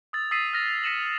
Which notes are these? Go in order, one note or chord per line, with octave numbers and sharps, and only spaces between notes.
D#6 E6 A6
D#6 E6 A6 B6 C7 D#7
F6 A#6 F7
A#6 B6 C#7 D#7 E7 F#7